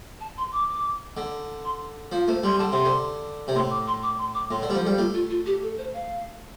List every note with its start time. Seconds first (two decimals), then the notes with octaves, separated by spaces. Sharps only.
0.20 A5
0.37 C6
0.53 D6
1.17 D3
1.64 C6
2.12 F3 F5
2.28 A3 C5
2.43 G3 C6
2.58 D3 A5
2.71 C3 C6
2.85 D3
3.48 C3
3.55 A2 C6
3.70 D6
3.87 C6
4.03 D6
4.18 C6
4.34 D6
4.51 A2 C6
4.62 D3 C5
4.70 G3
4.75 F3
4.83 A4
4.87 G3
4.98 A3 F4
5.14 F4
5.30 F4
5.46 G4
5.63 A4
5.78 C5
5.94 F5